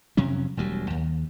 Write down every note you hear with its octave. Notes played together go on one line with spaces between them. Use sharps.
F2 C3 F#3 C#4
E1 D2 F#3 G3
D#2